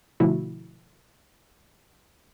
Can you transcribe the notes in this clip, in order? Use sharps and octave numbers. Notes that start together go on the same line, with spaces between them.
B2 D3 F3 A3 E4 F#4